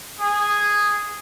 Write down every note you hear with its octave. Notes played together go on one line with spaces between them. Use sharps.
G#4